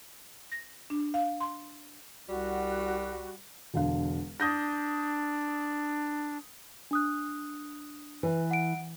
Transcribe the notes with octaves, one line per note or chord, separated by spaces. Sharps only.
A#6
D4
F5
C6
C2 G3 F#4
E1 D3 F5
D4 D#6 G6 A#6
D4 D#6 F#6
E3 B4
F#5 D7